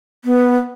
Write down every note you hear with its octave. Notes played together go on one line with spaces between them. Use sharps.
B3